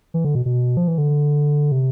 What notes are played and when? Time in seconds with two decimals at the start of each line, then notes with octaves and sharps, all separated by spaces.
0.14 E3
0.25 D3
0.35 B2
0.45 B2
0.77 F3
0.88 E3
0.98 D3
1.72 C3